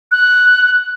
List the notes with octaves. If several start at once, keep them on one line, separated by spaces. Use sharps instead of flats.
F#6